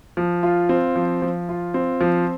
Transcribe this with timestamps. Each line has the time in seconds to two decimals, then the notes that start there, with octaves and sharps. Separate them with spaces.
0.17 F3
0.43 F4
0.69 C4
0.96 F3
1.22 F3
1.49 F4
1.74 C4
2.01 F3